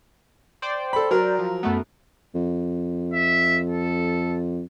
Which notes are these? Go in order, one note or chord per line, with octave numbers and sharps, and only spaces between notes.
C5 D5 G5
A4 B5
F#3 A#4
F3
F#2 A3 B3
F2
E5
A4